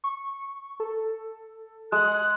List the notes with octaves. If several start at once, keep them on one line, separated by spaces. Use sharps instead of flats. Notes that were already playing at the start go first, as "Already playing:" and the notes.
C#6
A4
G#3 F#6